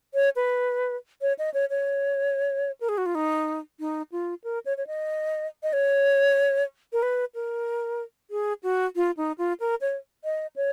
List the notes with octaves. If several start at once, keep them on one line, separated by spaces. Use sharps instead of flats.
C#5
B4
C#5
D#5
C#5
C#5
A#4
G#4
F#4
F4
D#4
D#4
F4
A#4
C#5
C#5
D#5
D#5
C#5
A#4
B4
A#4
G#4
F#4
F4
D#4
F4
A#4
C#5
D#5
C#5